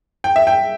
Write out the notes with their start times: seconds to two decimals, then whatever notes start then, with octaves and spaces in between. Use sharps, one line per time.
0.24 G5
0.36 E5
0.47 G5